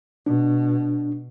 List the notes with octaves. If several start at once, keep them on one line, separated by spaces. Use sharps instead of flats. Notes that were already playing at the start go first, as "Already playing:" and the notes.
B2 D4